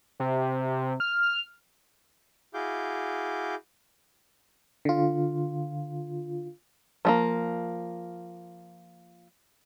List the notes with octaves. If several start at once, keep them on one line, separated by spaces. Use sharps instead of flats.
C3
F6
E4 F#4 G#4 F5 D6 G6
D3 F4
F3 A3 A#3